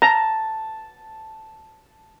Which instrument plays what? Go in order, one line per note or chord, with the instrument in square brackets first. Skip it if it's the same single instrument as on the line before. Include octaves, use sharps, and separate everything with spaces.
[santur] A5 [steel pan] A#5